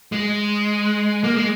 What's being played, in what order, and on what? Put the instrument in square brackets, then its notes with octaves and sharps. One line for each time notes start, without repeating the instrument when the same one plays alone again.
[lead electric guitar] G#3
A#3
G#3